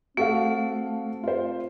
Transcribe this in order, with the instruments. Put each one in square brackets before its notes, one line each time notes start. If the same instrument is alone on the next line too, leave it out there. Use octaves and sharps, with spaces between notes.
[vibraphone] A3 [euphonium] C4 [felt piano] F#4 A4 F5
[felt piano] F4 C5